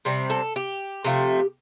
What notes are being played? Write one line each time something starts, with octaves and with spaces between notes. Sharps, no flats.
C3 G3 C4
A4
G4
C3 F3 A3